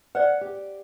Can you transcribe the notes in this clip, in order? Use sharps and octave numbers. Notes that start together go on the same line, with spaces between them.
B4 C5 D5 F#5
G4